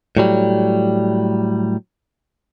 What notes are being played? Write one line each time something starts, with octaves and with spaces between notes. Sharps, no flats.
A2 F#3 G3